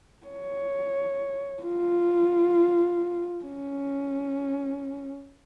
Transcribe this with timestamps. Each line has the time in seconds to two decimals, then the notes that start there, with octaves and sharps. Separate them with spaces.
0.27 C#5
1.63 F4
3.44 C#4